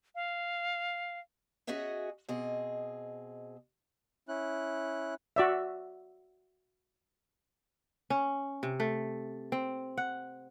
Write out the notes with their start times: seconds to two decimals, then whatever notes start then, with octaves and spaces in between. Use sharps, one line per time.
0.15 F5
1.67 C#4 F#4 G#4 D#5 E5 F#5
2.29 B2 C4 G#4 D#5
4.28 C#4 E4 F#6
5.36 F#4 D5 E5
8.10 C#4
8.63 C3
8.80 A3
9.52 C4
9.97 F#5